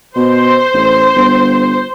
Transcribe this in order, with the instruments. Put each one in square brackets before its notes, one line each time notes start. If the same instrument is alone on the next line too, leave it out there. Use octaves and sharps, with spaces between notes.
[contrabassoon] B2 [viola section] C5
[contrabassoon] A1
G1